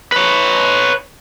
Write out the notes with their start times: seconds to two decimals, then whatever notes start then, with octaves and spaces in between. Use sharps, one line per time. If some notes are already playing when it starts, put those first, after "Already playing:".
0.12 B4 C#5